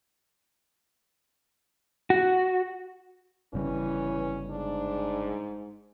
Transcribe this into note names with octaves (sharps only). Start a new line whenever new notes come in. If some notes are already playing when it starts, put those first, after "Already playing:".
F#4
G1 C#3 E3 G3 C#4
G#2 D4